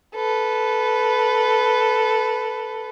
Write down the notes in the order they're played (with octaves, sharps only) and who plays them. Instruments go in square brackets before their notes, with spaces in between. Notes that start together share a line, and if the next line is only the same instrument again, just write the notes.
[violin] A4 B4